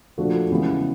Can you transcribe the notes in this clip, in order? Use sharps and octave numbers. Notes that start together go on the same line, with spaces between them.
A#2 F3 A3 D4 F#4
C#3 E3 G#3 B3